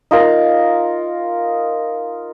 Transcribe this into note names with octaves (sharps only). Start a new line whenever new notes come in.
D#4 F4 A#4